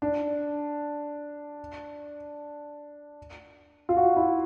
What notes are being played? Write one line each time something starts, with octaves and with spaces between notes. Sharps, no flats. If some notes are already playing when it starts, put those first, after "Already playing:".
D4
F4
F#4
E4